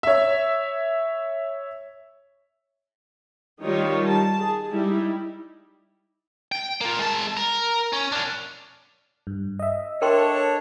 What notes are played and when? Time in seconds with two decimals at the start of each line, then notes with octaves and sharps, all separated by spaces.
0.03 C#5 E5
3.62 D#3 G3 D#4 F4 C#5
4.05 A5
4.40 G#4
4.71 G3 D#4 E4
6.52 G5
6.81 A#3 F4
6.99 G#3 A5
7.37 A#4
7.93 C#4
8.12 D4 A#4
9.27 G2
9.59 D#5 E5
10.02 D4 A4 A#4 C#5 G5 C6